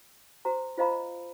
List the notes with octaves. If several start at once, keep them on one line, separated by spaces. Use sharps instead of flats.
F#4 C5 A#5
F4 C5 D#5 F5 A#5 B5